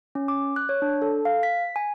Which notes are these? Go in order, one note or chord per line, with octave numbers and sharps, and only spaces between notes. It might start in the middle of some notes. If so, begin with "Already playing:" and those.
C#4
D6
F#6
C#5
D4
A4
F5
B6
G#5